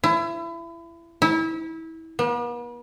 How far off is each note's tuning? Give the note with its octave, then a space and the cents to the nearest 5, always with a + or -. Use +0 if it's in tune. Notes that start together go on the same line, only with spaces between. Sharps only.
E4 +30
E4 -25
B3 -45